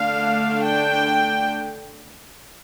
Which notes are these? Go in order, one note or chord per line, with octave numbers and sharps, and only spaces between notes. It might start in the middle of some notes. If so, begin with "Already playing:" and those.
Already playing: D3 A3 D4 F5
G5